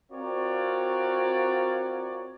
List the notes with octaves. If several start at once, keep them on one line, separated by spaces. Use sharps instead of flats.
C4 F4 F#4 A#4 C#5 D5